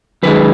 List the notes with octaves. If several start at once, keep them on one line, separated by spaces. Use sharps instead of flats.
F#2 D#3 G#3 B4